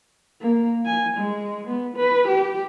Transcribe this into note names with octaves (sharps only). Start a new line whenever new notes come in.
A#3
G#5
G#3
B3
B4
G4